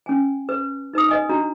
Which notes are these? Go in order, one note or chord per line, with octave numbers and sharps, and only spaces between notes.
C#4 G#5
B4
D#4 B4 A5 D#6
B4 D#5 G#5
D4 F#4 A#5